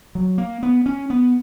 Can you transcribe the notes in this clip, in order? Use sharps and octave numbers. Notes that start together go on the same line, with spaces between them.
F#3
A#3
B3
C#4
B3